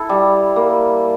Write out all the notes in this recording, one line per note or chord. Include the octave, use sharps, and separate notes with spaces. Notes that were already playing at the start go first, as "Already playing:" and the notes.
Already playing: E4 A4
G3
A#3